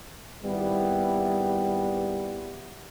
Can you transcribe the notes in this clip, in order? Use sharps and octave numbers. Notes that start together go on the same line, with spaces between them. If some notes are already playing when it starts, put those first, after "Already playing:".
G#1 G3 B3 E4